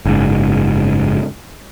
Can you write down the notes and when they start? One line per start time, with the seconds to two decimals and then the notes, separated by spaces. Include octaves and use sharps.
0.05 F#1 G#2